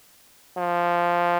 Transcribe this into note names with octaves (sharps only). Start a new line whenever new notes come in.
F3